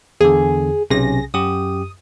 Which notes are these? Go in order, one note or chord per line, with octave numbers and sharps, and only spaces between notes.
E2 D3 G#4
B1 C3 C#4 G#4 A#6
F#2 G4 D#6